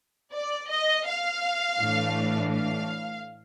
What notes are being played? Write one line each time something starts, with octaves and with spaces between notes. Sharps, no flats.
D5
D#5
F5
A2 E3 A3 D4
F5